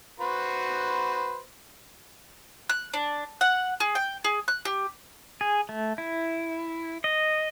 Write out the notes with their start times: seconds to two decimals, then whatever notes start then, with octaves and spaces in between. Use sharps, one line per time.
0.20 F#4 B4 C5
2.69 F#6
2.93 D4
3.41 F#5
3.80 G#4
3.95 G5
4.24 G#4
4.48 F#6
4.65 G4
5.41 G#4
5.69 A3
5.98 E4
7.04 D#5